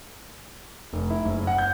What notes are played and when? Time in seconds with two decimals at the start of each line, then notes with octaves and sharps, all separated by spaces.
0.93 F1
1.10 E4
1.25 F#1
1.47 F#5
1.58 G6